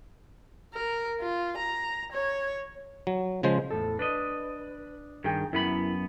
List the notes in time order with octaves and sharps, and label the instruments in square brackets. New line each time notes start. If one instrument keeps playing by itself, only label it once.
[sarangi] A#4
F4
A#5
C#5
[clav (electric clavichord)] F#3
C#3 F3 G#3 C5
[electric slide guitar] E2 A2 A4
[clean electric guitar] D4 D#5 [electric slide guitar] B4
[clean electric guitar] G2 D#3 [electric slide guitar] G4 G#4 G5
[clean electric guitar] F#2 B3 B5 [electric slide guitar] E4 A#4